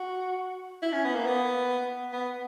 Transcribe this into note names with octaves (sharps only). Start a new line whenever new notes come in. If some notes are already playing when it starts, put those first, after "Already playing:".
Already playing: F#4
E4
C#4
B3
A#3
B3
B3